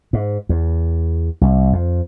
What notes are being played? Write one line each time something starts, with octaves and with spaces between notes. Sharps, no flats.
G#2
E2
C2
F2